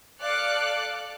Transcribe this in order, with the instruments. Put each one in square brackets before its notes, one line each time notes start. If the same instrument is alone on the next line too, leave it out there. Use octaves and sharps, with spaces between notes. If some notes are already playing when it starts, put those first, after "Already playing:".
[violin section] A4 D5 F5 D6 F#6 C#7